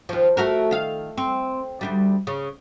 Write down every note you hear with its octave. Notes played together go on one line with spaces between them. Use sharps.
D#2 F3
A3 F#4 A#4
D#3 F5
C4
D2 C3 G3
C#3